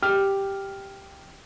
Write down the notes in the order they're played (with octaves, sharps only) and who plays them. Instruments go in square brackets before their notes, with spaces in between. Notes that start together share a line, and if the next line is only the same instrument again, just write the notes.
[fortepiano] G4 F6